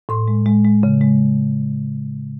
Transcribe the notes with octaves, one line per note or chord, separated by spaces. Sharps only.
A2 C6
G#3
G#3
G#3
C#3
G#3